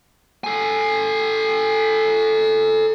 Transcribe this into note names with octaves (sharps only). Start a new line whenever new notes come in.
A4 G#5